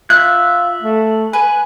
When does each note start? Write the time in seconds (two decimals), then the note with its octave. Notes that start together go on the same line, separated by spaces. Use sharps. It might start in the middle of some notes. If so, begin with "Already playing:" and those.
0.10 F4 E5 F#6
0.82 A3
1.33 B4 G#5